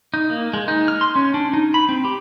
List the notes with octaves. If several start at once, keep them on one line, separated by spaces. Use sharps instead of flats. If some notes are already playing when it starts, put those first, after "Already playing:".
D#4
A#3
G#3
D#4
F6
C6
C#4
D4
D#4
B5
C4
G4